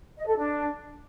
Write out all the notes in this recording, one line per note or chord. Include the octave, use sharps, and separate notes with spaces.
D#5
A4
D4